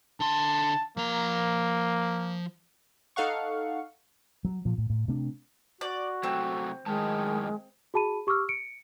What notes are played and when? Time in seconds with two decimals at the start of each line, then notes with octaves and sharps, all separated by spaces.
0.20 D3 A5 C6
0.97 F3 A#3 A#5
3.16 D#4 A4 F5 F#5 C#6
4.45 F#3
4.65 A#2 F3
4.78 A2
4.90 A2
5.08 C3 A3 C4 D4
5.81 F#4 D5
6.23 C3 F#3 A3 C4
6.86 F#2 A2 D#3 G#3 A5
7.94 F#4 G#4 A5 B5 D#7
8.27 G4 C#6 D6 E6 F6
8.49 C#7 D7